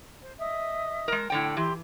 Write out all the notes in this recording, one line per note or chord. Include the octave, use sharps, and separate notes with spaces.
C5
D#5 E5 D#6
G#3 A#4
A2 D3 G5
E3 E4 G4 C6